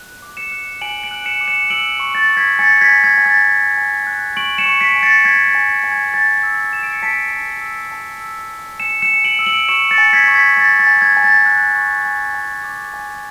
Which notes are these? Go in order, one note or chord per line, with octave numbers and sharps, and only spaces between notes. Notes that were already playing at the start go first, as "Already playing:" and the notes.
Already playing: F#6
D6
C#7 E7
F#6
G#5 D7 F#7
D7 F#7
F#6
C#7 E7
D6
C#7 E7
E6 D7 F#7
C#6
A6
C#6
G#6 B6
G#5 A6 C#7
G#6 B6
G#5
G#6
G#5
A6
G#5
G#5
F#6
C#6 D7 F#7
C#7 E7
C#6
B6 D7
G#5
A6 C#7
G#5 G#6 B6
A6
G#5
G#5
G#6
G#5 A6
E6
E6 E7
D7
C#7
A5 B6 D7
A5
E6
A5
E6
A5
G#5 C#7 E7
C#7 E7
G#5
D7 F#7
E6
D7 F#7
C#6 C#7 E7
A6 C#7
G#5
G#6 B6
C#6
G#6 B6
G#5 A6
A6
G#5
G#6
G#5
A6
F#6
C#6
G#5
G#5
D6
G#5